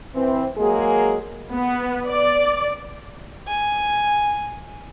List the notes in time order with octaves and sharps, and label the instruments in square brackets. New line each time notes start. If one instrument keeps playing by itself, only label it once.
[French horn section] E3 C4
F#3 G#3 A#3 G#4
[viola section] B3
D5
[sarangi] G#5